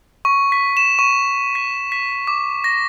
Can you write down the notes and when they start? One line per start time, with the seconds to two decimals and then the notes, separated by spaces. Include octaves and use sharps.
0.25 C#6
0.52 B6
0.77 E7
0.99 C#6
1.55 B6
1.92 B6
2.27 D6
2.64 A#6